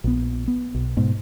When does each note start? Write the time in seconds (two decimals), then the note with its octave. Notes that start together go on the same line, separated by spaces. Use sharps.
0.04 A#1 B3
0.48 B3
0.75 B1
0.97 G#2 B2